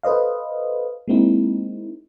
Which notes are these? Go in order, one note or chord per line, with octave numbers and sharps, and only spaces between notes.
A4 B4 C5 D#5 F5
G#3 A#3 C4 D#4 E4